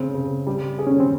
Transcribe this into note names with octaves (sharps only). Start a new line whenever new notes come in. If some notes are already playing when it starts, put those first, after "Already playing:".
Already playing: C#3 C4
C#3
G3
G#4
C#4
C4